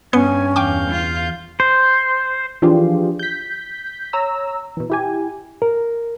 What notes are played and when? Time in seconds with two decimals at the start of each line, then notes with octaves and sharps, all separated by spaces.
0.13 G2 B3 C#4 B4 G#5 C#7
0.56 E2 F5 G5 G#5 D6 G6
0.90 F4
1.60 C5
2.62 E3 F3 D4 F4 G4 G#4
3.19 G6 B6
4.13 C#5 A#5 E6
4.77 B2 E3
4.90 E4 G4 G#5
5.62 A#4